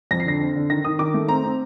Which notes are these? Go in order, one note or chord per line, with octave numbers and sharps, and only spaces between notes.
F2 A#6
C7
D3 A#6
C4
D3
D#3 A#6
D#3 D#6
D#3 D6
A3
C4 A#5
C4